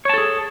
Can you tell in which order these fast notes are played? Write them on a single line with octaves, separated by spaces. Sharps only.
C#5 A5 A4 G#4